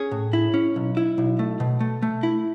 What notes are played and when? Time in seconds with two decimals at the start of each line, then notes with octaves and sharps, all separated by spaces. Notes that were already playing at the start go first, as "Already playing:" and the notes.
Already playing: C#4 G#4
0.11 A2
0.33 E4
0.54 C#4
0.76 B1
0.97 E4
1.18 B1
1.39 A3
1.60 B2
1.80 A3
2.02 A3
2.23 E4